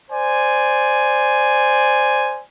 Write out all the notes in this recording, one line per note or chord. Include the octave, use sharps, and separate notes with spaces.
C5 D5 G#5